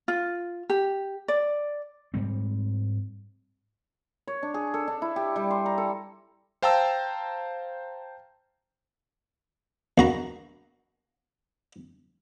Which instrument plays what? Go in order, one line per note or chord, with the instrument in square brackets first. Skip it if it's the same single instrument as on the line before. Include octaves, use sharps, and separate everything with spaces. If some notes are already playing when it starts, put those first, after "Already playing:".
[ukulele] F4
G4
D5
[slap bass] G#2 G3 C4
[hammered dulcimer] C#5
D4
G#4
A4
D4
E4
G4
G3
C6
A#5
A4
[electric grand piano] C5 F5 G5 A5 A#5 E6
[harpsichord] A#1 F#4 A#5